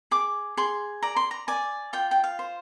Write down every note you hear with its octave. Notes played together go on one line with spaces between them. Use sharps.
G#4 D6
G#4 C6
D5 A#5
C6
A#5
D5 G#5
F4 G5
G5
F5
C5